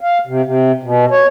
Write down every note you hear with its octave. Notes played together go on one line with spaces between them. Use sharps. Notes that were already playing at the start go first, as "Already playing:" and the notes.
F5
C3
C3
B2
C#5